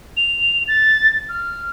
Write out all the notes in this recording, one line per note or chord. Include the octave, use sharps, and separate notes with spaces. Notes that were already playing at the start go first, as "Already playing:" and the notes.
F7
A6
F6